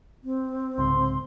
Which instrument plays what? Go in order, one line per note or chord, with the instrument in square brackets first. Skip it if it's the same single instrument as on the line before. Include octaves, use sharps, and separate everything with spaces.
[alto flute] C4
[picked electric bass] C2 G#2 C#3 [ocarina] C6